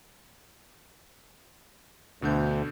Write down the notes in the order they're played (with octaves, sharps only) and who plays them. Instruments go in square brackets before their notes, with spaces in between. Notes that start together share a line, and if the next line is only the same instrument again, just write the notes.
[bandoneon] D2 [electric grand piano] B2 D3 G6